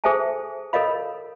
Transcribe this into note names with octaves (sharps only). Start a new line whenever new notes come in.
G#4 A4 C5 E5 G#5 A5
A4 A#4 C#5 D#5 F5 B5